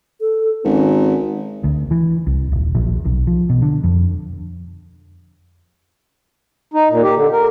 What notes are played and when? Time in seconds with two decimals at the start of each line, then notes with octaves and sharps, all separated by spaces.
0.21 A4
0.64 G#1 C#4
1.64 D2
1.91 E3
2.27 C2
2.52 D#1
2.75 A#1
3.05 B1
3.27 F3
3.50 B2
3.62 D3
3.84 F2
6.74 D#4
6.89 A#2
7.03 G4
7.16 D3
7.32 A#4